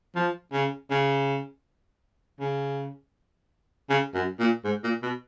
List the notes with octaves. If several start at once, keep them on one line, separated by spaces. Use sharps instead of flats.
F3
C#3
C#3
C#3
C#3
F#2
A#2
G#2
A#2
B2